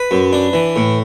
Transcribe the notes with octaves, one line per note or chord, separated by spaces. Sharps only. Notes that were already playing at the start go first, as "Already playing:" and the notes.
Already playing: B4
F#2
D4
E3
A2